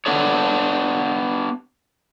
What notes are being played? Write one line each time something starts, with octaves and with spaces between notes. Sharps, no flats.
B3 D4 A4 C#5